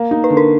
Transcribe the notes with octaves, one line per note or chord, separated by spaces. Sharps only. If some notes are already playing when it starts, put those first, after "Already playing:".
Already playing: A#3
D#4
B4
D3
A#4